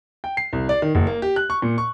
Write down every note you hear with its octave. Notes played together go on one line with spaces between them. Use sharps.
G5
C7
C2
D5
D#3
F#1
A#3
G4
F#6
C#6
A#2
C#6